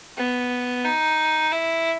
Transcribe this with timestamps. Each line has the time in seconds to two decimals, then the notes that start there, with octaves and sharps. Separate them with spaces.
0.17 B3
0.85 D#4
1.52 E4